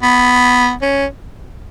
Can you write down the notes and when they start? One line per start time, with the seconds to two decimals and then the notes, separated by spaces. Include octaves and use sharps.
0.03 B3
0.82 C#4